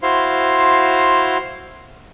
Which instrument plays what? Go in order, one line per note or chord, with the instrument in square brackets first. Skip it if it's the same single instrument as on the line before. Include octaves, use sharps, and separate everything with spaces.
[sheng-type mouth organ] E4 F#4 C5 F5 C6